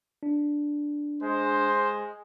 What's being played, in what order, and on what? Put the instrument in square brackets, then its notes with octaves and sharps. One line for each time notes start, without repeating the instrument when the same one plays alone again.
[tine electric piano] D4
[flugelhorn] G#3 [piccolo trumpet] C5